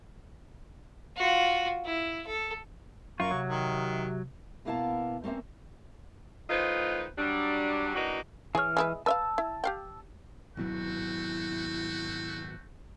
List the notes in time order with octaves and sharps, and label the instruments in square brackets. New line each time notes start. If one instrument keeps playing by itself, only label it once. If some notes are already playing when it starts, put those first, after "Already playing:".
[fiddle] F4 F#4
E4
A4
[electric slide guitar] F#2 F4 [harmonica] A#3 C#6 [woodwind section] A#4
[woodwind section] C3 [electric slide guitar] F#3
[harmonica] D#3
[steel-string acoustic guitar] B2 A#3 B3 E4 F5 A5
A3 A#3 C4 C#4 E5
[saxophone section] A2 D#3 F4 B4 C5 D#5
F#3 G3 D4
E3 A#3 D4 D#4 F#4
[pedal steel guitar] E3 F6 [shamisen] G#4 C#5
[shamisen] G#3 E4 B4
[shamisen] B4 E5 F5 [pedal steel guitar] A5 E6
[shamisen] E4
G4 F5 G5
[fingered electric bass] G#1 B2 F#3 [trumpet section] A3 C4 F#4 [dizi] E4